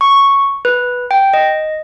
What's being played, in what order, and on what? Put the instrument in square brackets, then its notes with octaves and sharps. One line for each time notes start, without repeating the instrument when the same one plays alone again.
[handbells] C#6
B4
G5
D#5